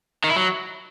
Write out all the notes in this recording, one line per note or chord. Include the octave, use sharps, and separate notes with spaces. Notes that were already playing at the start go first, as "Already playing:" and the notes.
D#3
E4
F#3